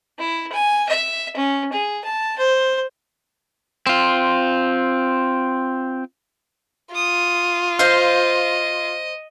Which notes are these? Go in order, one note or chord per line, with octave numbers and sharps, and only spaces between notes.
E4
G#5
E5
C#4
G#4
A5
C5
C4 F4
F4 D#6
C5 D#5 F5